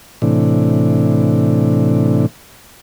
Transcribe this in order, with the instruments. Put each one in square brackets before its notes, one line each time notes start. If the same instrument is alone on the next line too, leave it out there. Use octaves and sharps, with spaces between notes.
[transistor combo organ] A2 C3 E3 D4